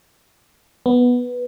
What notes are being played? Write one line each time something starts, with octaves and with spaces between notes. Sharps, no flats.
B3